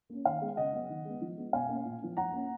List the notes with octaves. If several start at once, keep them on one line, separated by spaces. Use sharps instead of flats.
A#3 C#4
D#3 F5
G#3 B3
C#3 D#5 F#5
F#3 B3
D#3
G#3 B3
F3
G#3 B3
B2 F5 G#5
A#3 C#4
A#2
F3 B3
F3 F#5 A#5
A#3 C#4